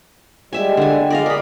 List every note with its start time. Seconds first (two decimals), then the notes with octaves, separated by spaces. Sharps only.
0.53 G3 G#3 G4 E5 G#5
0.77 D3 G#5
1.10 F#2 G#3 D5 D#5 F5
1.26 G#4 A#4 D5 B5